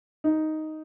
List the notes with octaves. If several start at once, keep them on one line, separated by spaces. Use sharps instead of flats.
D#4